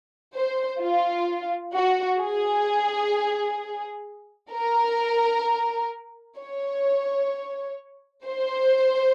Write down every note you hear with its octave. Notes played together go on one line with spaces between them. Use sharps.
C5
F4
F#4
G#4
A#4
C#5
C5